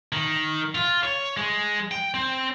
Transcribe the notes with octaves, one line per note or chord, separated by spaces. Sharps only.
D#3
F4
C#5
G#3
G5
C4